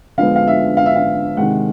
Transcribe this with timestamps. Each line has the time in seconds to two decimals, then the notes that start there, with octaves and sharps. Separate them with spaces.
0.18 D3 F3 G#3 B3 F5
0.36 F5
0.47 E5
0.77 F5
0.86 E5
0.96 F5
1.37 C3 D#3 G#3 F#5